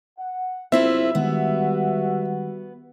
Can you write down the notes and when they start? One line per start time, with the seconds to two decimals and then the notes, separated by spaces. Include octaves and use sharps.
0.19 F#5
0.72 F#1 C2 C4 E4 F4 E5
1.15 D#3 G3 G#3 B3 F#4